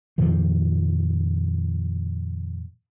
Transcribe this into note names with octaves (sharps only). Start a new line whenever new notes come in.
F2 A#2 D#3 F3